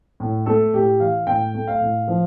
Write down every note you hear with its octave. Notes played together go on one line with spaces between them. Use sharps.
A2
A3 A4
A2 G4
E3 F5
A2 G5
A3
F5
A2
F3